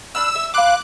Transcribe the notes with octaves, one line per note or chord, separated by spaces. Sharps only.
D4 B5 E6 F6
E5
F5 B5 C6 D6 F#6